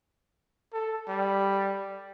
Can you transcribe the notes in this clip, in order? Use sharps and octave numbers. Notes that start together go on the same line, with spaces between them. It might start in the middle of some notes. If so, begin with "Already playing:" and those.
A4
G3